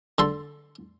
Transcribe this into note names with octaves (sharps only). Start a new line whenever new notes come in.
D3 A4 C6